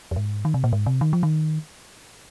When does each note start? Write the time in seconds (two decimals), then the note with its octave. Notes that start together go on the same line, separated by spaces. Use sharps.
0.11 F2
0.16 G#2
0.45 D#3
0.54 C3
0.64 A#2
0.73 G#2
0.86 C3
1.01 D#3
1.13 F3
1.23 D#3